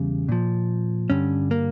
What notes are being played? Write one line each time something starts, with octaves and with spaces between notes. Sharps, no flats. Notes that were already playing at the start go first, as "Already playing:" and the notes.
Already playing: E2 C#3 G3
A#2 F3
G2 D3 G3 C#4
A#3